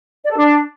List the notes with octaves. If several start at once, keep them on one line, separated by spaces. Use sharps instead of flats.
D5
A4
D4